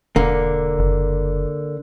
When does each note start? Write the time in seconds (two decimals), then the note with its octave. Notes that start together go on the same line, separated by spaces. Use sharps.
0.16 E1 D3 A#3
0.79 F#1